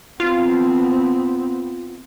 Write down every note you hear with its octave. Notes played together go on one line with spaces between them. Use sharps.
B3 C4 F4